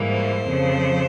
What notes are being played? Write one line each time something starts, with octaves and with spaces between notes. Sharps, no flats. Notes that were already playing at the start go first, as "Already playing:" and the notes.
Already playing: G#2 E3 G3 A#3
C5
F2 C#3 F3